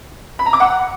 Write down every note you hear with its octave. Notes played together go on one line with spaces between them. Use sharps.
B5
A#5
D6
F#5